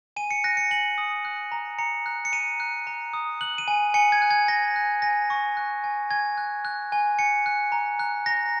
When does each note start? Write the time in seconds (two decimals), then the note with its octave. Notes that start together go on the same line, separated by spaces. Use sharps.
0.16 G#5 D#7
0.31 C#7
0.44 F#6 A#6
0.57 C#7
0.71 G#5 F#7
0.98 D#6
1.25 F#6
1.52 A#5
1.78 A#5 C#7
2.06 F#6
2.25 C#7
2.33 A#5 D#7
2.60 F#6
2.87 A#5
3.13 D#6
3.41 F#6 F#7
3.58 D#7
3.68 G#5
3.94 G#5 C#7
4.12 G#6
4.22 F#6
4.31 G#6
4.48 G#5 A#6
4.76 F#6
5.02 G#5 A#6
5.30 C#6
5.57 F#6
5.84 G#5
6.10 G#5 G#6
6.38 F#6
6.65 F#6
6.92 G#5
7.19 G#5 C#7
7.46 F#6
7.72 A#5
7.99 F#6
8.26 A#5 A#6